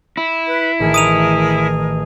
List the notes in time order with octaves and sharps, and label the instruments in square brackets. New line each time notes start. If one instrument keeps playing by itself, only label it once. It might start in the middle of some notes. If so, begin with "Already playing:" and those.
[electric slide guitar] E4
[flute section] B4
[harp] A1 D#3 [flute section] G#4 A#4
[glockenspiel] D#6 D#7 F7